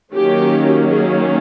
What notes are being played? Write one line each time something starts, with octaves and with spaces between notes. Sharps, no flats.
D#3 F#3 A#3 C#4 G4
G#4